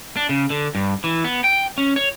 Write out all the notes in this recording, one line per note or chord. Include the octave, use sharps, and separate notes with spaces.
D4
C#3
D3
G2
E3
B3
G5
C#4
C#5